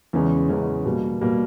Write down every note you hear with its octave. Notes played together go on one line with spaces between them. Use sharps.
E2 C#3 E3 G#3 C#4
E2 C#3 E3 G#3 C#4
B2 G3 A#3
B2 G3 A#3